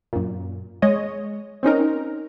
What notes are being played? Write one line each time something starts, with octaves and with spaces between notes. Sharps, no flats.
F#2 A#2
G#3 C#5 D#5
C4 C#4 D#4 A#4